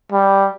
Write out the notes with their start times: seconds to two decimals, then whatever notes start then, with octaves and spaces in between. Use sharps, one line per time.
0.12 G3